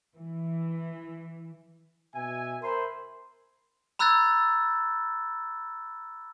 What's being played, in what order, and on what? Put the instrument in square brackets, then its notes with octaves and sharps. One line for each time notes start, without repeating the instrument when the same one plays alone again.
[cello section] E3
[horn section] B2 E5 G#5
A#4 C5 E5 B5 C6
[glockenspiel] A#5 B5 E6 F#6 G#6 A6